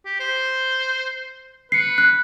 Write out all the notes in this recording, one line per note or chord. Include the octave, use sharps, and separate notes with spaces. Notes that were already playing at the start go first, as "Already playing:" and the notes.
G4
C5
B4 C7 C#7
F#6